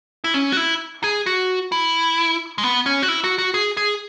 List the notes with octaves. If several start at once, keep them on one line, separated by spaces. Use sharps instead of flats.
E4
C#4
F#4
E4
G#4
F#4
E4
G#3
B3
C#4
F#4
E4
F#4
F#4
G#4
G#4